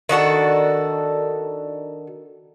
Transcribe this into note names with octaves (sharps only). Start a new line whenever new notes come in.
D#3 D4 F#4 A4